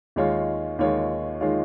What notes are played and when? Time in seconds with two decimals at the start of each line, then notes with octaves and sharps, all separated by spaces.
0.16 D#2 D#3 G#3 F4 C#5
0.79 D#2 D#3 G#3 F4 C#5
1.41 D#3 G#3 F4 C#5